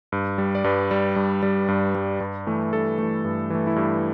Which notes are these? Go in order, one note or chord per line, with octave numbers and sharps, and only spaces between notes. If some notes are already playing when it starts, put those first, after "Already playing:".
G2
G3
D5
G2 B4
G3
G2
G3
G2
G3
G2
E3 A3
G2 A4
E3 A3
G2
E3 A3
E4
G2 G4